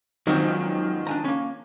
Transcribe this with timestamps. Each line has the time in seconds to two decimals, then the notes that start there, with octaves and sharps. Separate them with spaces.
0.27 G#2 D#3 F3 F#3 C4
1.07 D4 G#5 A#5
1.24 A#3 C#4